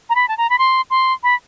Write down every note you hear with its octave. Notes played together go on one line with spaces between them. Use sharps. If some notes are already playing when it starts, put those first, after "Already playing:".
A#5
B5
A5
A#5
B5
C6
C6
B5